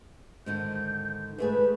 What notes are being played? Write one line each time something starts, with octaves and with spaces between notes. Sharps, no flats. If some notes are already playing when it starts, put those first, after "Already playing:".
G#2 D3 D#3 G6
G#2 A3 G#4 B4